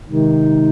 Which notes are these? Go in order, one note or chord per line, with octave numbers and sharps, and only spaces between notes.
C3 D#3 G#3 D#4